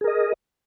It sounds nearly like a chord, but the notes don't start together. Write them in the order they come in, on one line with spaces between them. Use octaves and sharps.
G#4 A#4 D#5